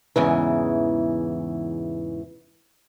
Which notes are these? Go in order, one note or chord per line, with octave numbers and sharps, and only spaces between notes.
E2 G#2 C#3 E3